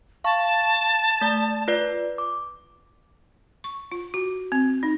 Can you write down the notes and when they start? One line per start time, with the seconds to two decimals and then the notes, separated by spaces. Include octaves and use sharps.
0.24 F5 A5 C#6
1.21 A3 D5
1.68 F4 B4 D5
2.18 D6
3.64 C#6
3.92 F4
4.14 F#4
4.52 C4
4.83 D#4